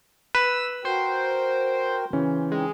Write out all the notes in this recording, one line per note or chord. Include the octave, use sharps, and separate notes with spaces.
B4 E6
F#4 A#4 C5 G5
C#3 E3 C#4
G#3 C4 D#4